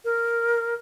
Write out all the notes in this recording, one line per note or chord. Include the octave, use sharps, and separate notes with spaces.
A#4